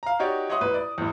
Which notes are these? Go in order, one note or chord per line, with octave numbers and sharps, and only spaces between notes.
F5 A#5
D#4 F#4 G4 C#5 D5
C#5 D#5 E5 F#5 C6 D#6
A1 B4
D5
A1 E2